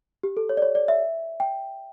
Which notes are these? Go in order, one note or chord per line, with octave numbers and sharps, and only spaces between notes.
G4
A4
C#5
D5
C#5
D5
E5
G5